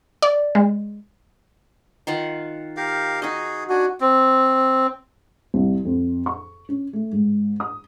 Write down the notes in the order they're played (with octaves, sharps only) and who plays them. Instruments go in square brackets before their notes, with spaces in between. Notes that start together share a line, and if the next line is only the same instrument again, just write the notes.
[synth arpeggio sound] D5
G#3
[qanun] D#3 F4 F#5
[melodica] G4 A#4 F5
[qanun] D#4 D#5 [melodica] F#4 G#4
[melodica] D4 G#5 [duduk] F#4
[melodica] C4
[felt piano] C2
F2
C#6
C#4
A3
G#2
D#6